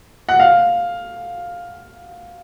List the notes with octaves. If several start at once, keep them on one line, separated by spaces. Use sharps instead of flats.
F#5
F5